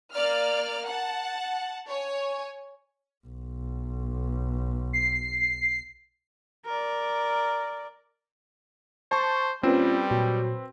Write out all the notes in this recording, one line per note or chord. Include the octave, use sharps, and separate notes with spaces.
A#3 D5 F6
F#5 A5
C#5 G#5
B1
C7
A#4 D5
C5 A5 C#6
A#2 G3 C4 C#4 B4
A#2 F#3